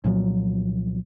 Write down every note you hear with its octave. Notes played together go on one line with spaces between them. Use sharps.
C2 A#2 F3 F#3